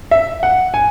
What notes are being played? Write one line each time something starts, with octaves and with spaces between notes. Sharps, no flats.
E5
F#5
G#5